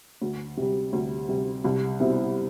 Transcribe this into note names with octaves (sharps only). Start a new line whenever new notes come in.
D2
C3 G3
D2
C3 G3
C2
B2 G3 C4 E4